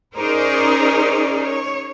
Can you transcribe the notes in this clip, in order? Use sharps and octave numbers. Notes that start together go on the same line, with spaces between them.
C#4 D#4 G#4 A#4 C5 D5
C#5